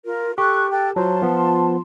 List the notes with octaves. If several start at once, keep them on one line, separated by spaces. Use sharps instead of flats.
F4 A#4
G4 A4 C#6 F#6
A4 G5 F#6
F#3 F4 C5 A5 C6
F3 B3